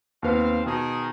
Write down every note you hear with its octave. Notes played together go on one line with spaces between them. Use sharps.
D#2 B3 C4 F5
B2 D#3 G#4